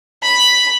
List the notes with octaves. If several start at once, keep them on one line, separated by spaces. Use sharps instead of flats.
B5